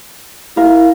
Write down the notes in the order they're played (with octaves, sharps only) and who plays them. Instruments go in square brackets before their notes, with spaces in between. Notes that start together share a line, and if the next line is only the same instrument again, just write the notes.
[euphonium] E4 [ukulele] A#4 F5